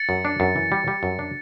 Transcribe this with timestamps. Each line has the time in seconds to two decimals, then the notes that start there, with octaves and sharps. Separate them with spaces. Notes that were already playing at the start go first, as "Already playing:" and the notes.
Already playing: A6 C#7
0.09 F#2
0.25 D4
0.40 F#2
0.56 E3
0.72 G3
0.88 G3
1.03 F#2
1.19 D4